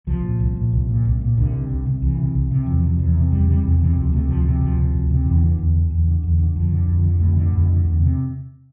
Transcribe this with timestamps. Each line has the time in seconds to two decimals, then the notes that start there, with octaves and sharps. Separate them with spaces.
0.07 C2 F3
0.24 A#2
0.40 C2
0.56 A#2
0.73 C2
0.88 A#2
1.05 C2
1.21 A#2
1.37 C2 D3
1.53 C3
1.69 C2
1.86 C3
2.02 C2 E3
2.18 C3
2.35 C2
2.51 C3
2.67 E2 F3
2.83 C3
2.99 E2
3.15 C3
3.32 E2 G3
3.48 C3 G3
3.63 E2 E3
3.80 C3 E3
3.96 D2 F3
4.13 C3 A3
4.29 D2 F3
4.45 C3 F3
4.61 D2 F3
4.78 C3
4.94 D2
5.10 C3
5.26 E2 E3
5.42 D3
5.58 E2
5.75 D3
5.90 E2
6.07 D3
6.23 E2
6.39 D3
6.56 F2 F3
6.71 D3
6.88 F2
7.04 D3
7.20 F2 A3
7.36 D3
7.53 F2
7.69 D3
7.85 E2
8.02 C3